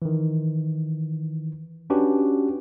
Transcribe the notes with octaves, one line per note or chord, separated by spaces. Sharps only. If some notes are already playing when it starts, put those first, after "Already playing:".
D#3 E3
C#4 D4 F#4 G4 B4